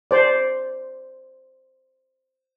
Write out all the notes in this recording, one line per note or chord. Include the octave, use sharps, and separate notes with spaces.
C5 D5